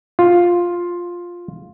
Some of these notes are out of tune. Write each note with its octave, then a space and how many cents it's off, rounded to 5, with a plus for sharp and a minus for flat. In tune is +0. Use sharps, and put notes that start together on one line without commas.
F4 +5